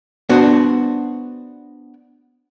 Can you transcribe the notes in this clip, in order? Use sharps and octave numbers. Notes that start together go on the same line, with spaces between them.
B3 D4 F#4 C5